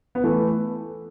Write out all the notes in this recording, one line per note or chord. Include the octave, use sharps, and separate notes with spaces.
B3
E3 A3